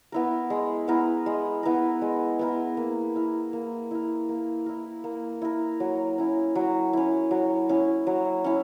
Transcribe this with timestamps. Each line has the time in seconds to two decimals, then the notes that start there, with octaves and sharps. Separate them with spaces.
0.12 B3 E4 A#4
0.50 G#3
0.88 B3 E4 A#4
1.26 G#3
1.63 B3 E4 A#4
2.02 G#3
2.39 B3 E4 A#4
2.77 A#3
3.16 E4 A#4
3.53 A#3
3.91 E4 A#4
4.29 A#3
4.66 E4 A#4
5.04 A#3
5.42 E4 A#4
5.80 F#3
6.18 C#4 E4
6.55 F#3
6.93 C#4 E4
7.31 F#3
7.69 C#4 E4
8.07 F#3
8.44 C#4 E4